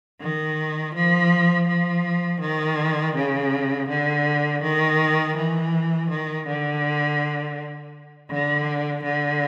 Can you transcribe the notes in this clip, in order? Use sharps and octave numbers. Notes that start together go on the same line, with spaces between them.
D#3
F3
F3
D#3
C#3
D3
D#3
E3
D#3
D3
D3
D3